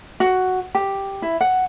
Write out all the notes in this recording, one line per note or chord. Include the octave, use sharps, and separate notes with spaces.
F#4
G4
E4
F#5